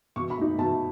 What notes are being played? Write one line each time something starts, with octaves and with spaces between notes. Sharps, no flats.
B2 C#6
B5
A3 D#4
B2 A5